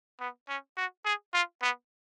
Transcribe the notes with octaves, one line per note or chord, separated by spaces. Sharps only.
B3
C#4
F#4
G#4
F4
B3